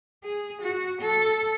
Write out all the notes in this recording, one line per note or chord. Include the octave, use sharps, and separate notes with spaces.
G#4
F#4
A4